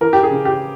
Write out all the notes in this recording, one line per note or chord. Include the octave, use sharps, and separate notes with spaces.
E3 A#4
G4
G#4
C#3
G4